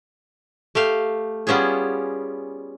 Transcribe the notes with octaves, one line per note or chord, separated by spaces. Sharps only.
A3 G4 F5
G3 B3 C#4 F4 G#4